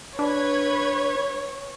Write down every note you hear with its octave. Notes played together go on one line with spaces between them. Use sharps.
D4 B4 C#5 G#6